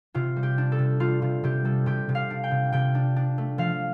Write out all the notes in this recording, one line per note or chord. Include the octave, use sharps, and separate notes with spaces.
C3 F4
G3
G4
D4
A4
C3
G3 F4
C3 F4
C3 G4
G3 A4
C3 G4
C3
F5
D4
G5
C3
C3 G5
D4
D4
A3
F3 F5